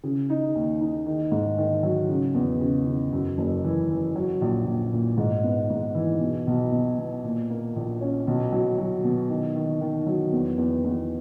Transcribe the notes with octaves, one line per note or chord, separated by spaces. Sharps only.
C#3
D#4
D#2
D#4
D#3
G#2
D#3
F#3
C#3
E2
C#3
C#3
F#2
F#1
E3
E3
F#3
A#1
A#1
A#2
G#2
B3
G#2
E3
B2
B1
B2
B2
A#2
A#3
A#1
C#4
B1
F#3
F#3
B2
D#3
D#3
D#3
F#3
E2
E2
E2